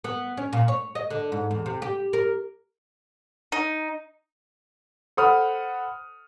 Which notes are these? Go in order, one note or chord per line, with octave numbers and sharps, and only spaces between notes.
B3
C#4
A#2
C#5
D#5
D3
G#2
E2
C3
G4
A#4
D#4
A4 C5 F#5 B5 D#6 F6